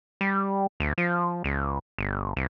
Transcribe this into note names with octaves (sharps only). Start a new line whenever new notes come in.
G3
D2
F3
C#2
G1
C2